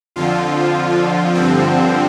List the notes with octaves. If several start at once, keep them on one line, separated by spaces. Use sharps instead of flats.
F2 D3 F3 F4
G2 D3 F3 C4